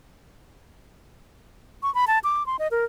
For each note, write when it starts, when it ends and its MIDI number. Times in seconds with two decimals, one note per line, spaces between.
1.83 1.93 85
1.95 2.05 83
2.07 2.19 81
2.24 2.46 86
2.46 2.56 84
2.59 2.68 75
2.71 2.85 70